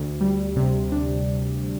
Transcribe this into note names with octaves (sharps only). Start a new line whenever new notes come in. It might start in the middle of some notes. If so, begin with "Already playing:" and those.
Already playing: D2
G3
C3
D4